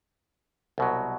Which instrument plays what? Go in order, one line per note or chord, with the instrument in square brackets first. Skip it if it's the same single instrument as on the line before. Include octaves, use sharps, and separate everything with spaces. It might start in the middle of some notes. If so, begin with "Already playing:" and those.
[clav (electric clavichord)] C2 B2 F#3